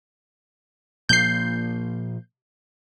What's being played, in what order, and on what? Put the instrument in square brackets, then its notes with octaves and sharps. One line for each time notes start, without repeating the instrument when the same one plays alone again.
[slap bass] A#2 F3 A#3 [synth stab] G6 C7